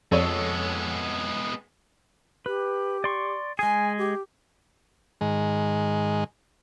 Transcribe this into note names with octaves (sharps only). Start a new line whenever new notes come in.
F2 G#3 B3 A4 C#5
G4 B4
D5 C6 C#6
G#3 G#4 G#5
G4
G#2 D#3 G#3